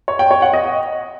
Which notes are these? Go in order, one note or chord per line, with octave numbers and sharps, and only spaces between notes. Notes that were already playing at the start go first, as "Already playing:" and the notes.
C#5
G5
C#5
F#5
D#5